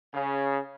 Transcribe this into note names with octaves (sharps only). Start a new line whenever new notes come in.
C#3